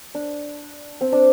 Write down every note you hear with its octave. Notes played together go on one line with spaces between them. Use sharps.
D4
C4
D4